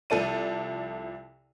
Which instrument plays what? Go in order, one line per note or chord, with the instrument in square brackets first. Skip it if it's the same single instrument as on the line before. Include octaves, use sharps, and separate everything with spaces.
[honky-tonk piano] C2 F3 A4 D5 D#7